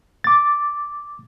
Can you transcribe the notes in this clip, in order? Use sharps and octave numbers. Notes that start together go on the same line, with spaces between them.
D6 A6